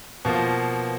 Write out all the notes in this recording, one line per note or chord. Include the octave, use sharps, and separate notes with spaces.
B2 F3 A#3